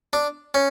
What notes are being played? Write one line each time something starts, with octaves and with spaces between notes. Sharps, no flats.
D4
C#4